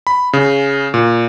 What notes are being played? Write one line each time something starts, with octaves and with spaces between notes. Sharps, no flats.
B5
C#3
A#2